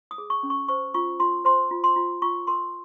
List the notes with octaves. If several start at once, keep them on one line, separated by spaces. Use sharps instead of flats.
D#6
G#4
C#6
C#4
C#6
C5 C#6
F4 C#6
F4 C6
C5 C6
F4
C6
F4
F4 C#6
A#4 C6